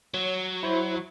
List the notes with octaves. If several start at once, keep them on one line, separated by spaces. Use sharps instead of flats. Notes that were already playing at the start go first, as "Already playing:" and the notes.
F#3 C#5
E4 C5